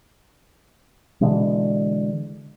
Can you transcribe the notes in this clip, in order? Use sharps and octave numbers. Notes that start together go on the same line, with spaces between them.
B2 D3 E3 G#3